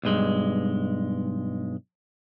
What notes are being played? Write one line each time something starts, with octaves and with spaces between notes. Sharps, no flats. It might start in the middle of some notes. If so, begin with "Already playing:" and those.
B1 G2 G#3